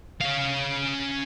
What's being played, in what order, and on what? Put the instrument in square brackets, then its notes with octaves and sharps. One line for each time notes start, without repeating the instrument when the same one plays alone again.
[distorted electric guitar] C#4 F5